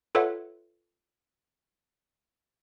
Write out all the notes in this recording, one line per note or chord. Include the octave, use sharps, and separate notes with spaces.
F4 A4 B4 C#5 E5 F#5